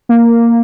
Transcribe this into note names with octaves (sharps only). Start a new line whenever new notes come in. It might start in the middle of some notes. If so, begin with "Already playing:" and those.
A#3